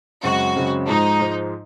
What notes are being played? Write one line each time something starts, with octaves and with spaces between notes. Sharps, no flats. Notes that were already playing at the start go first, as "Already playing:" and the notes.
F#2 C#3 G#3 C4 F#4
F#2 C#3 G#3 C4
G#2 F3 G#3 D#4
G#2 F3 G#3